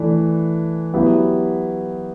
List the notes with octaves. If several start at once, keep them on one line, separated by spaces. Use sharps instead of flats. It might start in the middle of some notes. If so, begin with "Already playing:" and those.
Already playing: E3 A3 D4
F#3 B3 E4 G4